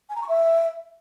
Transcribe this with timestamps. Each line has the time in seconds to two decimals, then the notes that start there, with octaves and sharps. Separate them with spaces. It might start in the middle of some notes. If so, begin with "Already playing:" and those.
0.09 G#5
0.16 A#5
0.22 C#6
0.28 E5